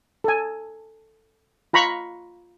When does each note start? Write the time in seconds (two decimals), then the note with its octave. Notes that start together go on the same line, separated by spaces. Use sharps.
0.24 A4 G#5
1.73 F4 A#5 B5 C#6